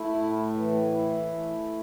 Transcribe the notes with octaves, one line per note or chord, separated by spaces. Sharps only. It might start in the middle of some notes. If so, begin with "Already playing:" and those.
Already playing: A3 E4
A2
E3
E4
A3